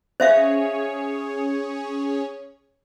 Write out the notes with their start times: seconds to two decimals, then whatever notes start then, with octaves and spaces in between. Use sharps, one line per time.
0.20 C#4 G#4 C5 C#5 E5 F5